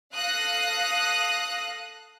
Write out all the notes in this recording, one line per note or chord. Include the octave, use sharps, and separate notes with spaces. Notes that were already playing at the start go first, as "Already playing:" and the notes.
A4 F5 D#6 F#6 A#6